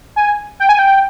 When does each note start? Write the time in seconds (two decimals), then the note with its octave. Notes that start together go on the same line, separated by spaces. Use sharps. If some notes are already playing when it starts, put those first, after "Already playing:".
0.16 G#5
0.60 G5
0.69 G#5
0.79 G5